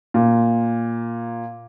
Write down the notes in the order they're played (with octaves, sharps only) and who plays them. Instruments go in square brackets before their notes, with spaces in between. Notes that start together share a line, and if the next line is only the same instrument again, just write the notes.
[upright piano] A#2